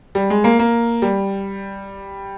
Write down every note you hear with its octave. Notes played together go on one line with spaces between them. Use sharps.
G3
G#3
A#3
A#3
G3